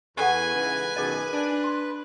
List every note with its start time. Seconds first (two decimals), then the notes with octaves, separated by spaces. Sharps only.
0.17 E2 G4 A4 B4 F#5 G#5
0.55 G#2 C#3 E3
0.96 F#2 B2 D#3 G#4 D#5
1.33 D4
1.64 C6